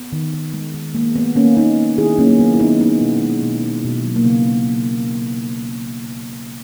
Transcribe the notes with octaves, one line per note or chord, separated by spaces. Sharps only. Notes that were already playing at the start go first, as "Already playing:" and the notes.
Already playing: B3
D#3
D#3
G#3
D#3
G#3 A#3
D#3 B3
D#3 A#3 C#4
A#3 B3 D#4
A#3
D#3 E4 G#4
F#3 A#3 C#4
A#3
D#3 B3
E4
D#3 B3 D#4
G#3 B3 D#4
B2
G#3
B2
B2
B2
F#3
A#3
C#3 B3